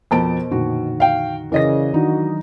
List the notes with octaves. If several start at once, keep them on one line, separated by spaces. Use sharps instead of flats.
F2 B2 A#4 C5 D#5 A5 D7
F2 A#2 D3 D#3 F#4
F5 G5
C#3 E3 A#4 D5 D#5 F5 A#6
D#3 F#3 D4 D#4 F#4